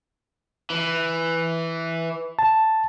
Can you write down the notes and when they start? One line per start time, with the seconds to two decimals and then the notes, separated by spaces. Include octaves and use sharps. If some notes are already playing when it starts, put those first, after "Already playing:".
0.70 E3
2.39 A5